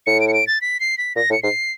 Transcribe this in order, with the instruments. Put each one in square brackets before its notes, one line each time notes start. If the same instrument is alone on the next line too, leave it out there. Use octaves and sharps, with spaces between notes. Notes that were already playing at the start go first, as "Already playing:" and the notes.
[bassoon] A2 [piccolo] C#7
[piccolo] D7
C#7
D7
A6
B6
C7
B6
[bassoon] A#2 [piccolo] A#6
[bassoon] A2 [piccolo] C#7
[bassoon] G#2 [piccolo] C7